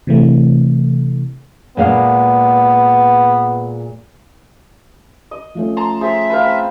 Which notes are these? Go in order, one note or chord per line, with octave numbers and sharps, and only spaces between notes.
C3 E3 A3
A#2 G#3 B3 F5
D#5
F3 A3 C#4
A5 A#5 C6
G#4 C5 E5
B4 C5 F5
C4